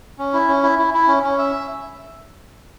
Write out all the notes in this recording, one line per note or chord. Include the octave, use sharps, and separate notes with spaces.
C#4
E4
C#4
E4
E4
E4
C#4
C#4
E5